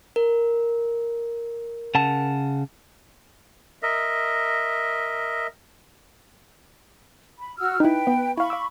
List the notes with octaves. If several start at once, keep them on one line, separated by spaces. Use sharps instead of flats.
A#4
C#3 F#5 A5
A#4 D#5 E5
B5
F#4 E6 F6
D#4 E4 B4 G5
B3
E4 F5 B5 C#6
F5 D6 E6